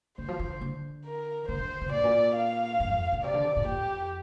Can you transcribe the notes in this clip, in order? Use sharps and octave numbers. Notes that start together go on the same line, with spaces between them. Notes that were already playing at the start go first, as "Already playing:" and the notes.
D3 C5
F3
F3
D3
D3
A#4
D3 C5
D3
C3
A#2
G2 D5
A#2
F5
G2
F2
A#2
C3 D5
D3
C3
A#2
F2 G4